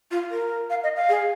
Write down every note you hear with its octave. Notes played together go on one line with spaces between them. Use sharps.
F4
A#4
F5
D#5
F5
G#4